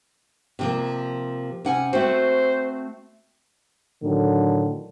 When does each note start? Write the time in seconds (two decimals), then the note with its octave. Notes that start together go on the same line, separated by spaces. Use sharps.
0.59 C3 F3 A#3
1.65 C3 C#4 F#5 G#5
1.93 A3 C4 F#4 C5
4.04 A2 D3 D#3 F#3